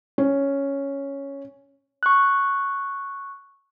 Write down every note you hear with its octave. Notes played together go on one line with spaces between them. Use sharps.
C#4
C#6 F#6